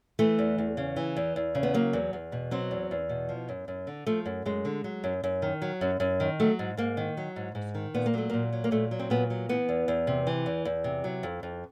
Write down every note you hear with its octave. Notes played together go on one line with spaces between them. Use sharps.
E3 A3
E2
E2
C#3
E3
E2
E2
C#3
B3
F#3 A#3
E2
E2
B2
F#3 C4
E2
E2
B2
F3
F#2
F#2
D3
F3 A3
F#2
F#2 G#3
D3
F#3
F#2
F#2
D#3
F#3
F#2
F#2
D#3
F#3 A3
G#2
G#2 A#3
D#3
F#3
G#2
G#2
D#3
A#2 B3
A#3
F#3 A3
A#2 A#3
F#3
A#3
A#2 A3
F#3
C4
A#2 B3
F#3
E3 B3
E2
E2
C3
E3
E2
E2
C3
F#3
F2
F2